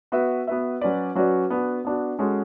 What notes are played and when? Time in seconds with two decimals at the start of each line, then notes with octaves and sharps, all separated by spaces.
0.12 B3 F#4 B4 E5
0.47 B3 F#4 B4 E5
0.81 F#3 C#4 F#4 B4 D5
1.15 F#3 C#4 F#4 B4 D5
1.50 B3 D4 F#4
1.85 B3 D4 F#4
2.19 G#3 C#4 F#4 A4